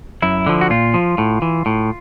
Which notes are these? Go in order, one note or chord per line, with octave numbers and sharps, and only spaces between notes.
F#2 E4
D3 F3
F#4
A#2 F4
F3
A2
E3
A2